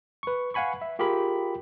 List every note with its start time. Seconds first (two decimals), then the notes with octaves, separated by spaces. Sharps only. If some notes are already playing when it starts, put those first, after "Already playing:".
0.23 B4 C#6
0.54 F5 F#5 G#5 B5 C#6
0.82 E5
0.99 F4 G4 G#4 A#4 B5